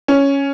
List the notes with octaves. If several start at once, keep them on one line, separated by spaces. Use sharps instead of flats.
C#4